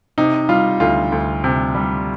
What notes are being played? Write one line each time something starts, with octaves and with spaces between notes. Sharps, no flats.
C3 D#4
G3 F4
D2 F4
D2
C3
G3